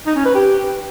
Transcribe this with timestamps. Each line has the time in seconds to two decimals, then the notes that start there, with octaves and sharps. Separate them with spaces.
0.07 D#4
0.16 C#4
0.25 B4
0.35 G4